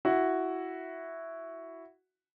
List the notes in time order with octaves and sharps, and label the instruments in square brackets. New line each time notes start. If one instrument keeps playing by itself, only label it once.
[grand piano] E4 F#4